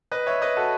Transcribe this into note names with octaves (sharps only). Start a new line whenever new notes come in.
B4 D#5
C#5 E5
B4 D#5
F#4 A4